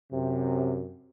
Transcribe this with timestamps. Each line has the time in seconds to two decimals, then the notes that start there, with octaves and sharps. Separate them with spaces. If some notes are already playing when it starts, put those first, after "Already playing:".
0.12 F#2 C3